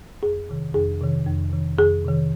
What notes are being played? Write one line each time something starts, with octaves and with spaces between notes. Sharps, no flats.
F2 G#4
C3 D#3
F2 G#4
C3 D#3
F2
C3 D#3
F2 G#4
C3 D#3